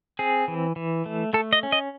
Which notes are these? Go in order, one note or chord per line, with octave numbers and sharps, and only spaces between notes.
C4 G#4
E3
E3
A3
A3 A4
D#5
C#4
D#5